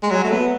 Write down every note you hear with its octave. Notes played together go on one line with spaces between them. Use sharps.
G#3
F#3
A3
B3